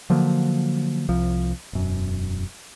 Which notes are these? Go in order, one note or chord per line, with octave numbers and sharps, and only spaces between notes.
D3 F3 F#3 A#3
C2 F3
E1 F#2